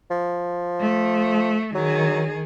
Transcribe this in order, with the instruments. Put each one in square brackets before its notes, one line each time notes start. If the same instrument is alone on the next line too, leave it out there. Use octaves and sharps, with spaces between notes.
[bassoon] F3
[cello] A3
[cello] D#3 G#4 [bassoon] F#3